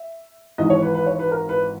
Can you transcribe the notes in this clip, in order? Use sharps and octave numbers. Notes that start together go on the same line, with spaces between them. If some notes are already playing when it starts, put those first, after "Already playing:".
Already playing: E5
G#1 G#2 E3 D#5
C#5
B4
B4
C#5
B4
A#4
B4